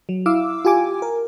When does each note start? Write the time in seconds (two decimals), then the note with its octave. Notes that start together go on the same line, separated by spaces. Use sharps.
0.09 F#3
0.26 E4 F5 D6 E6
0.65 F4 G4 G#5 D6
1.02 A#4